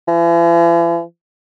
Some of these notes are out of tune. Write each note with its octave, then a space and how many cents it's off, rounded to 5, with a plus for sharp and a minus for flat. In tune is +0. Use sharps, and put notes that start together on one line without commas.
E3 +45